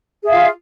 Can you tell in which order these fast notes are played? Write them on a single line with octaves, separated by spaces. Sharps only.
G#4 E5 F5 F4